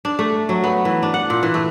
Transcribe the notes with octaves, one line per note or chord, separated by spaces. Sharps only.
D4
A3
F#3
B3
E3
D4
F#5
A#2
E3
A3